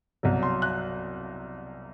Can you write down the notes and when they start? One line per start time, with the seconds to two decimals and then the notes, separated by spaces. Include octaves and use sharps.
0.23 C2 B2 F#3
0.43 C6
0.62 F#6